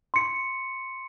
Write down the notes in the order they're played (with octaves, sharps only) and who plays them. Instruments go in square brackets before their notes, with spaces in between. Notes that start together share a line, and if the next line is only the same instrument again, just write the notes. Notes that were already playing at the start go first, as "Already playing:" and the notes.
[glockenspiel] C6 C#7